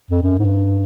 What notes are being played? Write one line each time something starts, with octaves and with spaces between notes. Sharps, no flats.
F2
F#2
G#2
G2